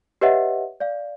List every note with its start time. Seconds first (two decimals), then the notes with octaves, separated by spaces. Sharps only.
0.21 G4 B4 C#5 D#5 E5 F#5
0.80 D5 F5